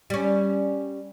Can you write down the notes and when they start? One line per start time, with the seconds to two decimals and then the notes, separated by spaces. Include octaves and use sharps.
0.10 G3 C#4